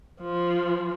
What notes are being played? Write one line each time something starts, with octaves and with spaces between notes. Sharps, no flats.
F3